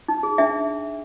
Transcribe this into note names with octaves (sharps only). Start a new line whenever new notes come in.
D#4
G#4
D4 E5